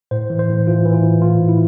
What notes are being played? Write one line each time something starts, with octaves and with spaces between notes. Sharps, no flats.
A2 C5
E3
C5
A2
E3 F4
E3
F4
E3
A2 F4
A2
E4